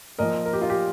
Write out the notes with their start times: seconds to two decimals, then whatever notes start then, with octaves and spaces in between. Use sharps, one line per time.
0.19 A#2 F3 A#4 D#5
0.46 A#4
0.53 G4
0.62 F4
0.70 G4